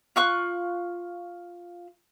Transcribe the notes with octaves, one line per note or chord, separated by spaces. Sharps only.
F4 C#6 F#6